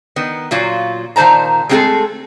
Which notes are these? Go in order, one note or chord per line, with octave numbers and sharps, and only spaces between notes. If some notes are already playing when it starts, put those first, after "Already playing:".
D#3 B3
A#2 F#3 F4
A#2 D#3 C5 A5 A#5
G#3 A3 C4 F#4 G#4 A4